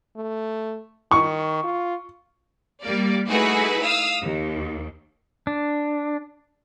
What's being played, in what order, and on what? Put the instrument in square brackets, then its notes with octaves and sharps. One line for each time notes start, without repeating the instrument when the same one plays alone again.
[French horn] A3
[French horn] D#3 [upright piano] C#6
[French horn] F4
[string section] G3 A#3 D5
A3 D#4 E4 F#4 G#4 B4
F5 D#6 E6
D#2
[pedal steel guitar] D4